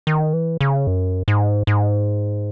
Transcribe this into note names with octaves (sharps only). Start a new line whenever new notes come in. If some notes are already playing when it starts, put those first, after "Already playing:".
D#3
E3
C#3
F#2
G#2
G#2